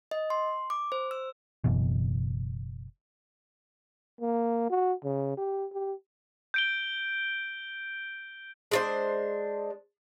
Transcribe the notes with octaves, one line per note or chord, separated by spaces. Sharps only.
D#5
C6
D6
C5
E6
F#1 F#2 B2 E3
A#3
F#4
C#3
G4
G4
G6 D7 G7
G#3 D4 C5